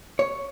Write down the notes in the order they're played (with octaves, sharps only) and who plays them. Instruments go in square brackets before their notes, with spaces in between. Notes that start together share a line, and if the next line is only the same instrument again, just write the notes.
[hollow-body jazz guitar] C#5